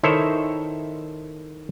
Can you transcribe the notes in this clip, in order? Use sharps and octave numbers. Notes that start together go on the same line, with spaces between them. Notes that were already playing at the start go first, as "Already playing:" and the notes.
D#3 E4 A4 C5 C#5 E5